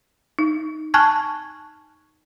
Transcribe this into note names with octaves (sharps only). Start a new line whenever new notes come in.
D#4
G#5 A5 C#6 F6 F#6 G#6